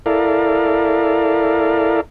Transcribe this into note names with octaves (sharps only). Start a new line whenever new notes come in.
E4 A4 A#4 D5 F5